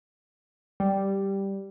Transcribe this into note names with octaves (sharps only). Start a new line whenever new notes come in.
G3